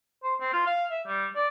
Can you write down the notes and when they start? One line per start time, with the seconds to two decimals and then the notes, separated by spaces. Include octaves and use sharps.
0.23 C5
0.40 C4
0.53 F4
0.67 F5
0.90 E5
1.07 G3
1.36 D5